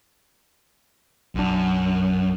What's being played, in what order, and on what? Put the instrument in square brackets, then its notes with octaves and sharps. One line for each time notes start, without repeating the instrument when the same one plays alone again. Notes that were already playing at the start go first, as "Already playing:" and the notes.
[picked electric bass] B1 D4 [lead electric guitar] F#2